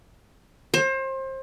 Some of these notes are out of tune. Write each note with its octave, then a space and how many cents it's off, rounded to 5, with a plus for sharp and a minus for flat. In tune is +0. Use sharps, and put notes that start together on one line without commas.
C5 +30